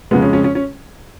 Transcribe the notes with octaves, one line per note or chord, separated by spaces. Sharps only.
F2 C#3 F3 G#3 B3
C#4
C#4
C#4
C#4